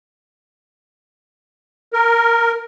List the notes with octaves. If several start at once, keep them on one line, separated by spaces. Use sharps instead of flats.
A#4